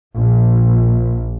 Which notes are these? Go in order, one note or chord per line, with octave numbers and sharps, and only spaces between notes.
A#1